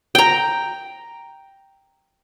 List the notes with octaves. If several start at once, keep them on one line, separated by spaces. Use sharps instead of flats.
G5 A#5